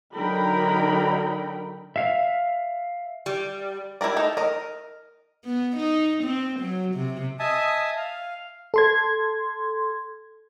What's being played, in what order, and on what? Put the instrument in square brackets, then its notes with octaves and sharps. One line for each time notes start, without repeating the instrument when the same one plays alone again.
[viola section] D3 F#3 D#4 A#4 G5 B5
[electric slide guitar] E5 F5
[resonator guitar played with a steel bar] G3
[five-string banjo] G3 E4 F#4 A#4 D5
A3 D#4 A4
A#4 D#5
[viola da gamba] B3
D#4
C4
F#3
C3
[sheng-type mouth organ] D#5 E5 G#5 A5 D#6
F5
[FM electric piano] A4 C6 G#6